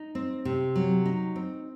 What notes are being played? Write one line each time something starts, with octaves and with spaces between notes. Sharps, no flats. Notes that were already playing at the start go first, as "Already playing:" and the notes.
Already playing: D#4
C4
C3
F#3
D#4
C4